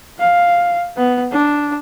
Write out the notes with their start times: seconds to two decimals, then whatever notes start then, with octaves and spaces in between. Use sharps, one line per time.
0.19 F5
0.97 B3
1.32 D4